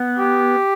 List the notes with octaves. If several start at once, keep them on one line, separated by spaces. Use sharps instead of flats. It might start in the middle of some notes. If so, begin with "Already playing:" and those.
Already playing: B3
G4